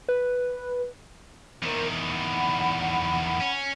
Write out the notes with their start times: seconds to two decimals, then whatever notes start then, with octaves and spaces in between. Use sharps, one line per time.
0.09 B4
1.63 E2 D#3 A#4 C5
1.99 F#5 B5
3.40 C#4